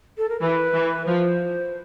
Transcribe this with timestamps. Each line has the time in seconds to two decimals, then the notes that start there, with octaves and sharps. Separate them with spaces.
0.18 A4
0.29 A#4
0.40 E3 B4
0.74 E3
1.06 F3 C5